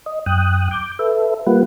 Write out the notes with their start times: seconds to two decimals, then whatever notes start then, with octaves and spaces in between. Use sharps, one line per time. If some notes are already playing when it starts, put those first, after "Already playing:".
0.06 D#5
0.26 F#2 G5 D#6 F#6
0.71 D6 G6
0.99 A4 B4 E5
1.47 G3 A#3 F4 B4 F#5